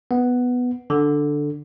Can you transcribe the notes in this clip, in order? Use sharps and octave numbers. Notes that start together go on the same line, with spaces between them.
B3
D3